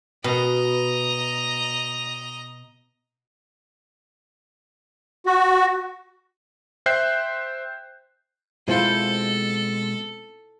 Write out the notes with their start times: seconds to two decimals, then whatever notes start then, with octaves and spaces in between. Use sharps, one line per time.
0.24 B2 D#5 A#5
5.26 F#4
6.86 C5 E5 G5 F#6 G6 C7
8.68 B2 G#3 C4 E4 F4 A4 C5